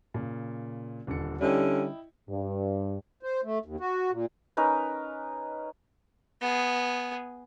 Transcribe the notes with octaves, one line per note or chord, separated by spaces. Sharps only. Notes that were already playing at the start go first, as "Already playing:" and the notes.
A#2 C#3
D#1 D3 C#7
D3 G3 C#4 E4 D#5 G5
G2
C5
A3
D#2
F#4
A#2
C#4 D#4 A#4 B4
B3 G#4